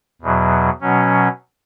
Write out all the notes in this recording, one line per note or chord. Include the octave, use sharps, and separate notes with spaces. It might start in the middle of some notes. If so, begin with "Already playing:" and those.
E2 B2 F#3
B2 F#3 C#4